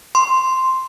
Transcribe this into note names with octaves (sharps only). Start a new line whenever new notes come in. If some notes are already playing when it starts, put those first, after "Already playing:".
C6